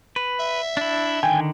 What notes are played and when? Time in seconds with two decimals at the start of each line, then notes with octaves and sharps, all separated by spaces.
0.16 B4
0.40 E5
0.77 D4 E4
1.23 D3 D#3 G5 G#5